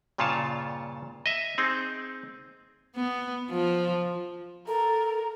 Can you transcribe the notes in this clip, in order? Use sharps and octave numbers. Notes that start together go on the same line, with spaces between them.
G2 A#2 C#3 F4 C#5 A5
D#5 E5
C4 D#4 G#4
B3
F3
A4 A#4